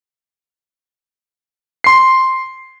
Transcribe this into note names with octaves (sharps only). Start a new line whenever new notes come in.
C6 C7